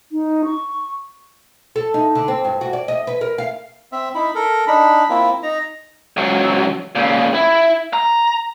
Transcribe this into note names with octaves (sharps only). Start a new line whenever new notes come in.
D#4
C#6
A4
D#4
D3
C4
G2
F#4
D5
D#5
B4
A#4
F5
C4 E5
D#4 E4 B5
A4 A#4
D4 D#4 B5
A#3 C4 E4 F4
D#4 A#5
C#2 F#3
A#2 C#3
E4
A#5